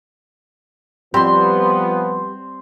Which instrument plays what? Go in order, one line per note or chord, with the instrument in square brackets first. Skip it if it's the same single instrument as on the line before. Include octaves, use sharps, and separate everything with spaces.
[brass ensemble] F3 B3 [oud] G3 [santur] C4 C6